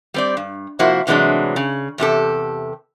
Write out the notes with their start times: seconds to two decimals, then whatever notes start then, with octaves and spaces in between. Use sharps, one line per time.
0.14 G3 C4 D5
0.37 G2
0.79 C3 F3 A#3 E4 F#4 C5
1.07 A2 C3 E3 F#3 G#3 D4
1.56 C#3
1.98 E2 C3 G4 A4